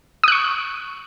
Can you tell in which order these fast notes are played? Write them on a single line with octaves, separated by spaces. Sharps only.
D#6 F#6 C#6